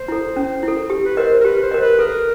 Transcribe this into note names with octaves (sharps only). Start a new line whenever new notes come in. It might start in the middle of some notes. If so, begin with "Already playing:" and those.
Already playing: C5
E4 A4
C#4
E4 A4
G4
B4
A#4 C5 D#5
A#4
G4 B4
C5
A#4 D#5
B4
A4 A#4